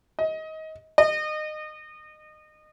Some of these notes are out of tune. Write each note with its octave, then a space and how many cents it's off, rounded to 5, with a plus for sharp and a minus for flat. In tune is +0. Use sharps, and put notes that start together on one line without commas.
D#5 +25
D#5 -25